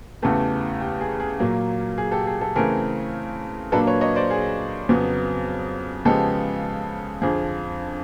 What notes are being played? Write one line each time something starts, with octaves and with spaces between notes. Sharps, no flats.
E2 C#3 E3 A3 G4 A4
G4
G#4
G#4
A#2 F#3 A#3
G#4
G4 A4
G#4
G4 A4
C#3 E3 A3 C4 G#4 A#4
A#2 F#3 A#3 D4 A4 B4
B4 C#5
C#5 D#5
C5 D5
G#4
F2 C#3 F#3 B3
C#3 F3 G#3 B3 G4 A4
F2 D3 F3 G#4